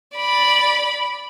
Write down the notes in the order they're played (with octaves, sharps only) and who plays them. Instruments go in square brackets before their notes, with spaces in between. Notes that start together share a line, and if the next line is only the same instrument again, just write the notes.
[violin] D5 B5